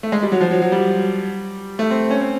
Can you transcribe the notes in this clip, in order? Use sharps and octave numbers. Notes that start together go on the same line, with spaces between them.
A3
G#3
G3
F#3
F3
F#3
F#3
G3
A3
C4
C#4
C4